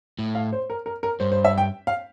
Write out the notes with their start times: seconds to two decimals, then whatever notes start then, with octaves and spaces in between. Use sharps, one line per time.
0.19 A2
0.35 F5
0.52 C5
0.70 A#4
0.86 A#4
1.03 A#4
1.20 G2 C5
1.32 C5
1.45 E5
1.58 G5
1.87 F5